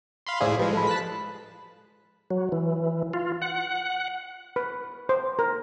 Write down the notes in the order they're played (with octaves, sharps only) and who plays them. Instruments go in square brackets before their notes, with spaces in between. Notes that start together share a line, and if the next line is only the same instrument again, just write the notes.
[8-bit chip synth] F5 B5 C6
[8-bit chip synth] A2 E4 G#4 [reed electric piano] C5 D5 F5
[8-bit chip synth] F3 G#3 [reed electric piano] G4 B4
[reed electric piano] A4 B5
[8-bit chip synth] A5 F#6 B6
[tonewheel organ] F#3
E3
F4
F#5
[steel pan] B4
C5
A#4